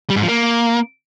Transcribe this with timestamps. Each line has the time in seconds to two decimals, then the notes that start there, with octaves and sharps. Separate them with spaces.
0.10 G3
0.16 G#2
0.22 F3
0.29 A#3